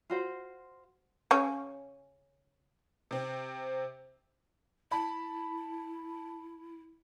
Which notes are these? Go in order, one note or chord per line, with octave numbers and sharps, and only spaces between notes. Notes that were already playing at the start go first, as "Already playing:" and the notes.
F4 F#4 C5
C#3 C#4
C3 C4
E4 A5 B5